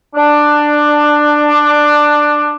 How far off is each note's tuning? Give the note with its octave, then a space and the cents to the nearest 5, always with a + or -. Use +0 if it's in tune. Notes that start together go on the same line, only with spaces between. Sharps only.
D4 +10